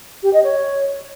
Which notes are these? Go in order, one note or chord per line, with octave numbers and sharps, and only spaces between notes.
G4
D#5
C#5